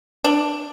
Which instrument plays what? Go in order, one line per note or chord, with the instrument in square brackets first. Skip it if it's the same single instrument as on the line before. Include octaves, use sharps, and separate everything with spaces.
[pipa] D4